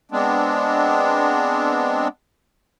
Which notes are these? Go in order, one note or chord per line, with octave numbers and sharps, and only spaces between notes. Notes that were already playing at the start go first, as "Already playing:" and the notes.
G#3 B3 C4 D4